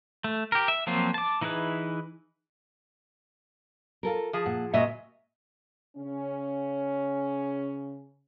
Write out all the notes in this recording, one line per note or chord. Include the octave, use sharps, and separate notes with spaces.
A3
G4 A#4
E5
F3 F#3 A#3 C4 F4
A5 D6
E3 D#4 E4 G#4 B4
F4 A4 A#4
F3 G#4 A5
A#2 F#5
A#2 G#3 F#4 D#5 E5
C#3 C#4